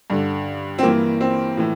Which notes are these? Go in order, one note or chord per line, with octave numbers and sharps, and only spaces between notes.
G2 D3
C4
G2 E3 A#3
C4
A2 E3